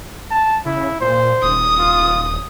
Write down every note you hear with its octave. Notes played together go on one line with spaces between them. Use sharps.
A5
C#3 E4
A#2 C5
D#1 D#6
F4